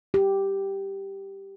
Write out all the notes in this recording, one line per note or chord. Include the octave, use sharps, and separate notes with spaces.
G4